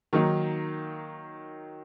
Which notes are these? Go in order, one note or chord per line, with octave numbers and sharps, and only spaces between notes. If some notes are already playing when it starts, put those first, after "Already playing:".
D#3 F#3 A#3 D#4